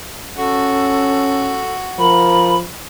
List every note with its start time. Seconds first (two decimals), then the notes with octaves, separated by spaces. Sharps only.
0.38 C#4 F#4 A4
1.99 F3 A#4 B5